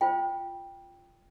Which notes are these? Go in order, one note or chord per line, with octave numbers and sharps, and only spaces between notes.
F4 C5 G5